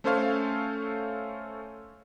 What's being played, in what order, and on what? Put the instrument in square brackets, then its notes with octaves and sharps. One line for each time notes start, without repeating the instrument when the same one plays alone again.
[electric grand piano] A3 C#4 A4 C5 C#5 F5